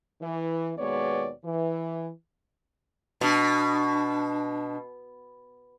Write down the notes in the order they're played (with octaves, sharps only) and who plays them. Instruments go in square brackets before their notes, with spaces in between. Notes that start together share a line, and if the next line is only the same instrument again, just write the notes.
[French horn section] E3
D#2 B2 G#3 B3 C#5 D5
E3
[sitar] B2 [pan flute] D4